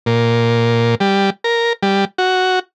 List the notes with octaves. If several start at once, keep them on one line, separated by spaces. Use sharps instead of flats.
A#2
G3
A#4
G3
F#4